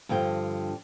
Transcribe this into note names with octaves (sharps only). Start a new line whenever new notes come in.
G2 D3 F3 G5